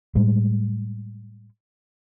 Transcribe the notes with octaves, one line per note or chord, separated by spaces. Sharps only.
A2 G3 G#3